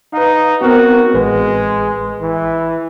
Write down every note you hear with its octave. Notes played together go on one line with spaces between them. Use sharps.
D#4 B4 F5
B3 C4 F#4 A#4
A1 G#3 B4
E3